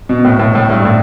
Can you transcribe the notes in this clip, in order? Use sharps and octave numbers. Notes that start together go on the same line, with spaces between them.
B2
A2
A2
A2
G2
A2